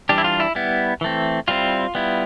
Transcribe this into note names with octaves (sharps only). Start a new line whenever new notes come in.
E3 G3 D4 G4
E4
F4
E4
G3 B3 E4
E3 A3 C4
G3 C4 E4 F4
G3 B3 E4